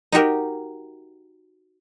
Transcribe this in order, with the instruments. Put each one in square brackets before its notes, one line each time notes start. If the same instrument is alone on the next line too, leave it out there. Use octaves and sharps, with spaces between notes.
[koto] D#4 F#4 G4 A#4